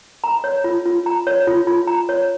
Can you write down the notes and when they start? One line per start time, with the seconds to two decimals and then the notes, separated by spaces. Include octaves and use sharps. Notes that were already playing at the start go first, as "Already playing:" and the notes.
0.24 A#5
0.44 C#5
0.64 F4
0.85 F4
1.06 A#5
1.27 C#5
1.47 F4
1.67 F4
1.87 A#5
2.09 C#5